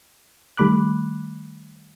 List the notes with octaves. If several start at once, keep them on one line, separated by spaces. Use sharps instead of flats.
D#3 G3 A3 B5 D6 F#6